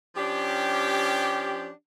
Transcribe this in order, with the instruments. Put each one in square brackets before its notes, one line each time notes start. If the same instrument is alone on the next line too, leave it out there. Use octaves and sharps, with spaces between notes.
[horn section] F3 C#4 D4 G4